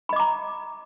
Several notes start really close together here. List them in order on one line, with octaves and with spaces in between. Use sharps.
B5 D#5 D6 A#5